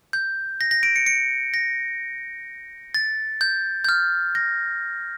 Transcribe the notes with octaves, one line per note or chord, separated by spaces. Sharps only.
G6
A#6
A#6
D7
C#7
C#7
A#6
A6
G6
G6
F6
A#6